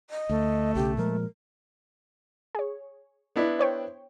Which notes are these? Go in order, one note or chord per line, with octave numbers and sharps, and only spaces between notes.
D#5
D2 A3
B1 C#3 G4
A#2 F3 G#3 A#4
G#4 C#5
B3 D4 E4
C5 C#5 G5